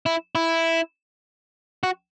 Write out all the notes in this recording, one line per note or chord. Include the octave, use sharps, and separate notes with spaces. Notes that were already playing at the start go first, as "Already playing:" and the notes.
E4
E4
F#4